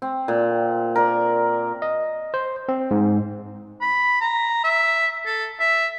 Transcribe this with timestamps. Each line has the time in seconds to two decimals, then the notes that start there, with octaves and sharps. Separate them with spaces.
0.02 C4
0.28 A#2
0.96 A#4 D5
1.82 D#5
2.34 C5
2.69 C4
2.91 G#2
3.81 B5
4.21 A#5
4.64 E5
5.26 A4
5.60 E5